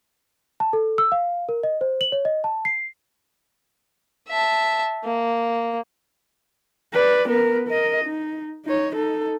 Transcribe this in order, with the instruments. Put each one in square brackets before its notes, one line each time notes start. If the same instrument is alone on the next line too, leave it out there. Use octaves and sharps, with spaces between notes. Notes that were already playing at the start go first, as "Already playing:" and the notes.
[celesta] A5
A4
E6
F5
A#4
D#5
C5
F#7
C#5
D#5
A5
C7
[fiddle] E5 A5
A#3
[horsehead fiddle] B4 D5
B3 A#4
A#4 D#5
D#4
D#4 C#5
D#4 A4